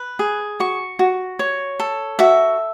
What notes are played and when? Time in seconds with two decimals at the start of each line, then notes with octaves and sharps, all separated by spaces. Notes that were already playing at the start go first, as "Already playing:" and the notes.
Already playing: B4
0.19 G#4
0.60 F#4 C#6
0.99 F#4
1.39 C#5
1.80 A4
2.19 F#4 E5